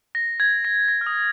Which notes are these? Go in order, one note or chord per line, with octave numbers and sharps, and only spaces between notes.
A#6
G#6
A#6
A#6
F6
D#6